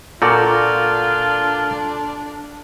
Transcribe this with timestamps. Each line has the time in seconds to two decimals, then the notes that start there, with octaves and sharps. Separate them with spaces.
0.22 A#2 D4 F4 F#4 A4 D5 A#5 G6